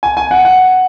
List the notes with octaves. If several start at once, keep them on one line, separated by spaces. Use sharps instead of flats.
G#5
G#5
F#5
F#5